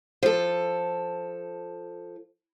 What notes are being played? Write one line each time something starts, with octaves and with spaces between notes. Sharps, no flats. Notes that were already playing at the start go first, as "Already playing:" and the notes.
F3 A4